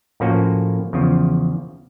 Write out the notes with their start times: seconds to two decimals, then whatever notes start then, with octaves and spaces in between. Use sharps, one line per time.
0.20 A2 F3 A#3 C#4 F#4
0.93 E2 C#3 F3